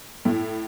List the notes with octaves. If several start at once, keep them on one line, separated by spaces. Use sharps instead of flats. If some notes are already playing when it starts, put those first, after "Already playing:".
A2 E4